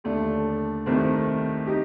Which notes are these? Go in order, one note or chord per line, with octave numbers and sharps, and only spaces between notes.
D#2 D3 A3 D4
C2 C3 D#3 A3 C4
D#4 G4